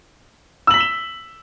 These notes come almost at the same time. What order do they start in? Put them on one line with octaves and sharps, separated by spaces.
E6 F#7 B6 G7 E7